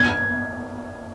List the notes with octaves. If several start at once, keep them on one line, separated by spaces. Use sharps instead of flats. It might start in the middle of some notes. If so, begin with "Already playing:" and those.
Already playing: G#6